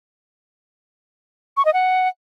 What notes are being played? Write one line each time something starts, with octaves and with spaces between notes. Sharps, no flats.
C#6
D#5
F#5